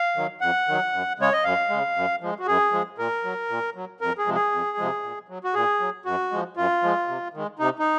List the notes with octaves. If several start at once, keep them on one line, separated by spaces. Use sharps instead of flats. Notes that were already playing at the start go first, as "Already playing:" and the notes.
Already playing: F5
D#3 F#3
F2 F#5
D#3 F#3
F#2
C#3 G#3 C#5
D#5
F#2 F5
C#3 G#3
F#2
F3 G#3
F#4
F#2 G#4
F3 G#3
A#2 A#4
F#3
A#2
F#3
F2 A#4
G#4
C3 F3 G#3
G#4
F2
C3 F3 G#3
A#2
F#3
F#4
A#2 G#4
F#3
F#2 F#4
F3 G#3
F#2 F4
F3 G#3
C3
D#3 G#3
C3 D#4
D#4